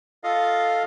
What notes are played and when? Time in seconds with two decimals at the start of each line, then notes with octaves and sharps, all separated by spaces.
0.24 F4 A4 D#5 F5